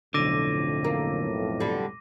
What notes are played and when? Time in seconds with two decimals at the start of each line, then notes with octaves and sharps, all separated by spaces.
0.14 B1 F2 A2 D3 D6 A#6 D#7
0.85 A#3
1.60 D3 G3